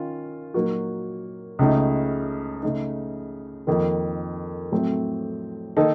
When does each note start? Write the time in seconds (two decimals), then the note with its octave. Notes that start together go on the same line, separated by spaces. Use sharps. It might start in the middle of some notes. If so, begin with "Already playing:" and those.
Already playing: D#3 C#4 F4
0.54 A#2 F#3 A#3 D#4 F#4
1.59 C#2 C#3 A3 D#4
2.63 C#3 A3 D#4
3.67 F2 D#3 A#3
4.72 A2 F#3 A3 C4
5.77 D#3 A#3 D#4 A4